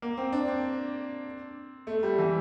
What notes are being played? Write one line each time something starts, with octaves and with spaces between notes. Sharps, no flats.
A#3
C4
D4
C4
A3
G3
E3